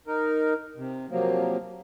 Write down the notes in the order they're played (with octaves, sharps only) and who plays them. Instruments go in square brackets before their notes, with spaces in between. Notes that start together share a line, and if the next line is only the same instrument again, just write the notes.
[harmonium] D#4 A#4
C3
C3 F3 F#3 A#3